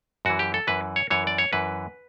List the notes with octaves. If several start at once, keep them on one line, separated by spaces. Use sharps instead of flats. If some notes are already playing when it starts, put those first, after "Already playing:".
F#2 E3 F#4
G4
A4
F#2 E3 B4
C#5
F#2 E3 C#5
D5
C#5
F#2 E3 B4